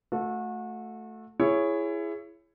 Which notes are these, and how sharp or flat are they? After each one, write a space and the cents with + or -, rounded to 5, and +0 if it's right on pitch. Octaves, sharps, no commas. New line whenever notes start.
A3 +0 F#4 -30 A4 +0
E4 +20 G#4 +0 C#5 +0